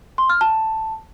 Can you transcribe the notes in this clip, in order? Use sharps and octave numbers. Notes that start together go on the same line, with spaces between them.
C6
F6
A5